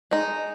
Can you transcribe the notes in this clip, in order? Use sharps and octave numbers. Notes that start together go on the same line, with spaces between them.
G#3 D#4